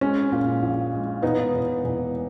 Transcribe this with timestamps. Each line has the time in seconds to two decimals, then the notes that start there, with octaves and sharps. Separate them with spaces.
0.01 G#3 C#4
0.32 A#2
0.62 A#1
0.93 G#3
1.22 E1 B3 D#4
1.53 E1
1.84 E1